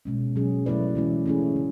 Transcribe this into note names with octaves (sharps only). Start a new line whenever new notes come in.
B2 G#3 C#4
F#3 C#4 G#4
F#3 A3 E4 B4 D5
E3 G#3 C#4 E4
A3 C#4 E4 G#4
C#3